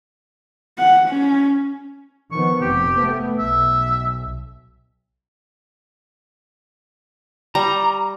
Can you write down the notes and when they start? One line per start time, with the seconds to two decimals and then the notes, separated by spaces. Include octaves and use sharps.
0.78 F#5
1.08 C#4
2.32 D#3 F3 B3 C#6
2.61 F1 C3 G4
2.98 A3 B3
3.39 B1 E5
7.55 G3 A#5